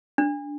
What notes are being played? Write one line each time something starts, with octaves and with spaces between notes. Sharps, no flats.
D4